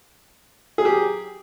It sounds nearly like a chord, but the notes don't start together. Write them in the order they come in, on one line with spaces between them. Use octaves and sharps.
G#4 F#3 G4